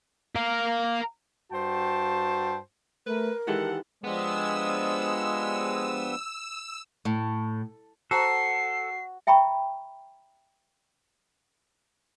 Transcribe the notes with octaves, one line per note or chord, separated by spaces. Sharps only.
A#4 F5
G2 F#4 C5 G5 A5
A3 A#4 B4
D#3 E3 G#3 G4 A4 F#5
F3 G#3 B3 D4 G4 E6
A2
F#4 A4 C5 A5 A#5 C7
E5 G5 A#5 B5 C#6